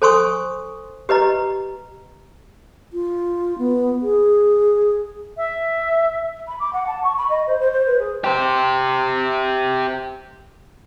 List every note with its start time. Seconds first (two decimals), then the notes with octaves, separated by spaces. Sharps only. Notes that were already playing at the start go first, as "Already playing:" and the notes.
0.02 A4 C5 G#5 C6 C#6 D#6
1.09 G4 B4 D#5 A#5
2.93 F4
3.58 B3
4.02 G#4
5.37 E5
6.48 B5
6.60 D6
6.73 F#5
6.87 A5
7.03 C#6
7.18 B5
7.29 D#5
7.47 C5
7.60 C5
7.72 C5
7.86 B4
7.99 G#4
8.24 G4 C5